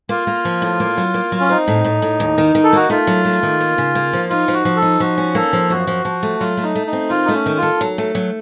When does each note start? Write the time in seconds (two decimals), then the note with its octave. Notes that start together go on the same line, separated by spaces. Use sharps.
0.09 A#3 F4
0.27 A#3
0.45 F3
0.62 A2
0.80 A#3
0.98 F#3
1.14 A#3
1.32 F#3
1.40 C#4
1.50 C4 D#4
1.68 A2
1.84 A2
2.02 A2
2.20 D#2
2.38 D#3
2.55 D#3
2.64 A4
2.73 A#3 F#4
2.90 A3 F4
3.07 F#3
3.25 A3
3.43 D#3
3.60 A#3
3.78 C#3
3.95 A#3
4.13 F3
4.30 D#4 F4
4.48 F3
4.53 F#4
4.65 F3
4.76 A4
4.82 D#4
5.00 F3 F#4
5.18 C#4
5.35 A#3 A4
5.53 F3
5.70 F#2 F#4
5.87 F3
6.05 F3
6.23 A3
6.40 F#3 F4
6.57 A3
6.63 D#4
6.75 A3
6.87 D#4
6.93 C4
7.10 D#3 F4
7.25 A3 D#4
7.34 C#4
7.46 D#3
7.57 F4
7.62 A4
7.81 F#3
7.98 A3
8.15 F#3